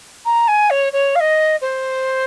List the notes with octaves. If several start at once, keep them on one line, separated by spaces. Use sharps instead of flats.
A#5
G#5
C#5
C#5
F5
D#5
C5